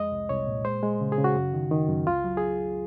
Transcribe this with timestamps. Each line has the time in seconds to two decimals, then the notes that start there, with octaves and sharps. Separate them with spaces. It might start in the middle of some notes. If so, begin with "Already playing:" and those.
Already playing: F2 G#3 D#5
0.12 C2
0.29 C2 C#5
0.47 A#2
0.65 G#3 C5
0.83 G#3
1.01 C#3
1.12 G#4
1.18 C#3
1.24 F#4
1.36 F#2
1.54 D#3
1.71 D#3
1.89 F#2
2.06 C#2 F4
2.24 F#3
2.37 G#4